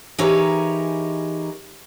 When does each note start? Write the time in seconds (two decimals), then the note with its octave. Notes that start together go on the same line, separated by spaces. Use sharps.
0.18 E3 D#4 G4 G#4 A#4 C#5